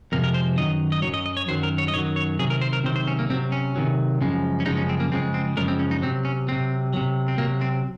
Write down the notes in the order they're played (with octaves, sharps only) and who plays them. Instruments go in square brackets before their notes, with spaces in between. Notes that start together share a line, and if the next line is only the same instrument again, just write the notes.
[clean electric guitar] F2 C3 F3 G#3 A#4
A#4
C5
F#2 D#3 F#3 D#5
D#5
F#2 D#3 F#3 C#5
D#5
D#5
C#5
F#2 D#3 F#3 C5
A#4
C#5
D#5
F#2 D#3 F#3 C#5
C#5
C3 D#3 F#3 G#4
A#4
C5
A#4
C3 D#3 F#3 C5
C5
C#4
A#3
C3 D#3 F#3 C4
C#4
C3 D#3 F#3
F#2 C#3 F3 G#3
C#4
F#2 C#3 F3 G#3 D#4
C#4
C4
A#3
F#2 C#3 F3 G#3 C4
C4
F#2 C#3 F3 G#3 A#4
C4
C#4
D#4
C3 F#3 C4
C#4
C3 F#3 C4
C3 F#3
C4
C3 F#3 A#3
C4